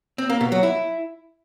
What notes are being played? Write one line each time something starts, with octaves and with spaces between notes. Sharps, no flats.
C4
A#3
B2
F#3
E4